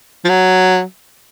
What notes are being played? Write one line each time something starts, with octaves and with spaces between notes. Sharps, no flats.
F3
F#3